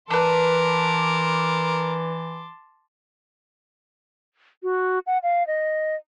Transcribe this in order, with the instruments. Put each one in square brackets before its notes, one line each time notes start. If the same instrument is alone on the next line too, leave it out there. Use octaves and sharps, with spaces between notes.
[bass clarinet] E3 [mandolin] D4 B4 [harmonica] A#4 [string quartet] A5 C6 D6
[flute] F#4
F#5
F5
D#5